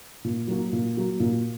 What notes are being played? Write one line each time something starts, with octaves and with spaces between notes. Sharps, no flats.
A#2
F#3 A#3 F#4
A#2
F#3 A#3 F#4
A#2